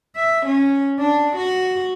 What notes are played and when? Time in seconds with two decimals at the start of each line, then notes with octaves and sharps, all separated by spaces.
0.16 E5
0.46 C#4
0.99 D4
1.36 F#4